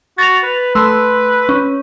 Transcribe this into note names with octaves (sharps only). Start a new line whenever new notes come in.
F#4 A6 F7
B4
A3 B4 C6 E6
C#4